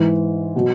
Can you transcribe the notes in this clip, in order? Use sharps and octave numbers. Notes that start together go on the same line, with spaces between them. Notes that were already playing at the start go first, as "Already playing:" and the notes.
Already playing: G#2 E3
B2 F#3